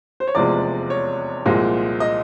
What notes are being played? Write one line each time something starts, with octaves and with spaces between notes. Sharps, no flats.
C5
C#5
F1 E2 C3 F3 G#3 D5
C#5
C2 A#2 F3 G#3
D#5